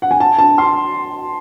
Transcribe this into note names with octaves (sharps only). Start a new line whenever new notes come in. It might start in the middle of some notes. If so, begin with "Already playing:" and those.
F#5
G#5
A5
A5
C6